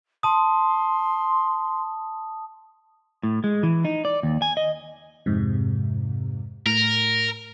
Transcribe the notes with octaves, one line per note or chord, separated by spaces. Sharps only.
A5 C6 D#6
A2
G#3
E3
D#4
D5
D#2
G#5
D#5
F2 G#2 C3
A2 A#4